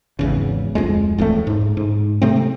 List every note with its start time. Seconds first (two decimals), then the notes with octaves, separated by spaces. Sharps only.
0.19 G#1 E2 C#3
0.75 D1 B1 F2 G#3
1.18 D1 E2 A2 A3
1.47 G#2
1.77 G#2
2.22 C3 A3 C4